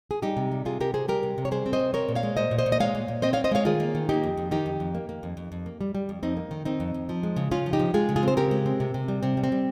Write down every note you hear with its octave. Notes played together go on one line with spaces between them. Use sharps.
G#4
G3 D#4 G4
C3
G3
C3 F4 G#4
C3 G4 A#4
C3 G#4 C5
G3 G4 A#4
C3
C3
C#5
G3 G#4 C5
C4
C5 D#5
C3
C4 A#4 C#5
A#2
C#5 F5
G#3
A#2 C5 D#5
A#2
C5 D#5
A#2
D#5
G#3 C#5 F5
A#2
A#2
C4 C5 D#5
C4 C#5 F5
C5 D#5
G#3 C#5 F5
D#3 F4 G#4
A#3
D#3
A#3 D#4 G4
F2
F2
D#3 D#4 G4
F2
F2
A#3
A#3
F2
F2
F2
A#3
G3
G3
F2
F2 C4 D#4
A#3
D#3
D#3 C4 D#4
F2
F2
F3
G#3
C#3
C#3 C#4 F4
F3
D#4 G4
F3
G#3 F4 G#4
C#3
F4 G#4
C4 C5
C#3 G4 A#4
G#3
C4
C3
C3
G3
C3 C4
G3
C4
G3